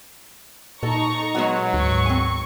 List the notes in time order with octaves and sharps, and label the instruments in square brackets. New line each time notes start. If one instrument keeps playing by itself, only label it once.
[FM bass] A#2 [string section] D#4 A#5 C#6 [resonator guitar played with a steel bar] A4
[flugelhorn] F#3 [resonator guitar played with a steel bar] G#3 B3 F#4
[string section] G#1 C#6 [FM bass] D2
[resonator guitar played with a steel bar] C4 G#5